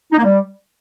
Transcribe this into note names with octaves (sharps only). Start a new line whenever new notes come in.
D#4
A#3
G3